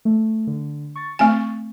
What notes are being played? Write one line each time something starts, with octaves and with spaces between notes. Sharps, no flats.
A3
D3
C#6 A6
A3 C4 G#5